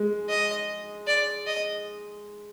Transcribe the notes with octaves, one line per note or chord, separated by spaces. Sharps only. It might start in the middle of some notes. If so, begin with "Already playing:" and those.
Already playing: G#3
D#5
D5
D#5